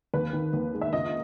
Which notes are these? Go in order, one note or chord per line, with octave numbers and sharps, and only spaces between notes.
D#2 B4
D#3
D#2
G#3
E5
C#2 D#5